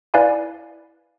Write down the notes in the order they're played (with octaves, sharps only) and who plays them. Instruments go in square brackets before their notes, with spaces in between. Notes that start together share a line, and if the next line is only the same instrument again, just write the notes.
[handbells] E4 B4 D5 F5 G#5 B5